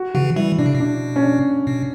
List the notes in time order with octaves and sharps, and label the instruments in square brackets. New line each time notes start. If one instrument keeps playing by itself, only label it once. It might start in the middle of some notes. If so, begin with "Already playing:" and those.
Already playing: [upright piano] F#4
[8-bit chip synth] C#3 E3 [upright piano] F#4
[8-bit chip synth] E3 G3 [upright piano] E4
[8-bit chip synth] B2 [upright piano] D4
[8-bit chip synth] C#3
B2
[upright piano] D4
C#4
D4
[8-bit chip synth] B2